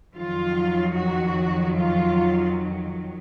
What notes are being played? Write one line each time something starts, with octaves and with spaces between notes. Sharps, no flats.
F2 D#3 F#3 F4
F#4
F4